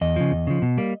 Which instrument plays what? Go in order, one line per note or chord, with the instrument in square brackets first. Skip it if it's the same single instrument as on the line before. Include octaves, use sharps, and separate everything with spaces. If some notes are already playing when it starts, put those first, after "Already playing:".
[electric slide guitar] E2 D#5
C#3 F3
E2
C#3 F3
B2
G3 A#3